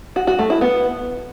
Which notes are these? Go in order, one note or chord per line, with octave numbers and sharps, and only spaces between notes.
F#4
F#4
A3
E4
B3